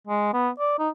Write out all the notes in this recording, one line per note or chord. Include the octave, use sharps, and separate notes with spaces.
G#3
B3
D5
D#4